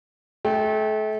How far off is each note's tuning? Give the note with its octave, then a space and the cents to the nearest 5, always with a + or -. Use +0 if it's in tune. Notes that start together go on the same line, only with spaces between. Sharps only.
A3 -35 G5 +0